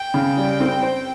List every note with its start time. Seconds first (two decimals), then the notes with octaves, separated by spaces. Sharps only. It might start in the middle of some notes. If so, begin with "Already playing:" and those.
Already playing: G5
0.14 C#3
0.37 G3
0.60 C4
0.83 C5